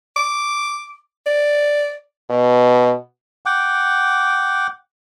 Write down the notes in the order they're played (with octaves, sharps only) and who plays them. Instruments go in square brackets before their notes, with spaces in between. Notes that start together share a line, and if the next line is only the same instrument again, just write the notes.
[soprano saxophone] D6
D5
[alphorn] B2
[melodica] F#5 G5 D6